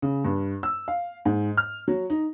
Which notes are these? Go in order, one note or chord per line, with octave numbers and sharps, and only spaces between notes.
C#3
G2
E6
F5
G#2
F6
F#3
D#4